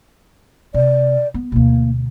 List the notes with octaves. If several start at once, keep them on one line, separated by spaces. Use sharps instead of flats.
C3 D5
B3
D2 B2 A#3